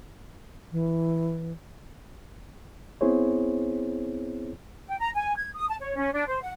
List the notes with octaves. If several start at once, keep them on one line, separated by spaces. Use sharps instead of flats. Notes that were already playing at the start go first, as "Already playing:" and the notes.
E3
B3 C4 E4 G#4 C5 C#5
G5
A#5
G#5
G#6
D#6
A5
C#5
C#4
D4
C5
F#5